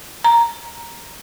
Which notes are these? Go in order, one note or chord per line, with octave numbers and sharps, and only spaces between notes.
A#5